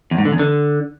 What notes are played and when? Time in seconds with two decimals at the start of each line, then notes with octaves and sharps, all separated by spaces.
0.11 E2
0.18 G#2
0.25 D3
0.32 E2
0.39 D3